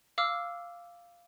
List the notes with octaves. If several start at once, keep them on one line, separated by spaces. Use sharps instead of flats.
F5 D6 E6 F6